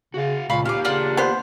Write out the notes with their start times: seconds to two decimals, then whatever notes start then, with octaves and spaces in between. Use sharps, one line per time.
0.14 C#3 F#4 F5
0.50 C#2 A#2 F5 B5 C#6
0.65 A#3 G4 F5 D6
0.85 C#3 D4 F4 F#5
1.17 B3 C5